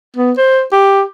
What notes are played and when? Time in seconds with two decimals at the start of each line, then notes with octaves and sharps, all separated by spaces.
0.16 B3
0.37 C5
0.72 G4